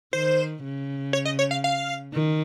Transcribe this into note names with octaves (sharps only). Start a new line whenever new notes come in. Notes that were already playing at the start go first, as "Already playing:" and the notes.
D#3 C5
C#3
C#5
D#5
C#5
F5
F5
D#3